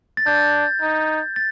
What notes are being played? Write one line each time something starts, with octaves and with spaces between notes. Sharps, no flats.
A6
D4 G6
D#4
A6